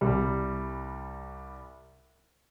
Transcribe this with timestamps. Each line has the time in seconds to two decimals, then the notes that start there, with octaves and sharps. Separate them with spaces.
0.01 C2 G3